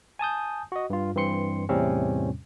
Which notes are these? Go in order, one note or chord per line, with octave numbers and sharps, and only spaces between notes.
G#5 A5 D#6 G6
F#4 D#5
G2 F4
G2 E3 C4 C6 C#7
E2 A2 C3 G3 C4 C#4